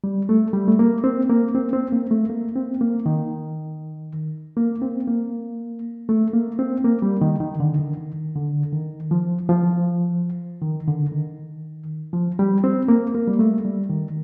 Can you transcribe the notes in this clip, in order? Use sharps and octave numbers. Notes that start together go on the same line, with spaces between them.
G3
A3
G3
A3
A#3
C4
A#3
C4
C4
A#3
A3
A#3
C4
A#3
D#3
A#3
C4
A#3
A3
A#3
C4
A#3
G3
D#3
D#3
D3
D#3
D#3
D3
D#3
F3
F3
D#3
D3
D#3
F3
G3
C4
A#3
A#3
G3
A3
G3
D#3